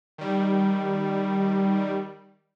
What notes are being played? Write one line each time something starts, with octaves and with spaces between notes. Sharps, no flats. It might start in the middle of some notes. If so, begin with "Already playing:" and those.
D#3 G3